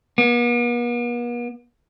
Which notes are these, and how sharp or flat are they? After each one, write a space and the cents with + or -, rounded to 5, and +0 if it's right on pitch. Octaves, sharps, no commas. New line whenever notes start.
B3 -45